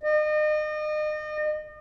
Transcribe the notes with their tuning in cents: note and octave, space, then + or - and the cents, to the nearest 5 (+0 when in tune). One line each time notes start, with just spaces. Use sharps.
D#5 -35